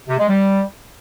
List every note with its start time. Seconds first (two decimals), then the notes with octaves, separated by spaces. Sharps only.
0.08 C3
0.18 G#3
0.29 G3